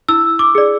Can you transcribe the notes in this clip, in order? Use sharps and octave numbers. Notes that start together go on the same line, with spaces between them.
E4 E6
D6
G#4 D5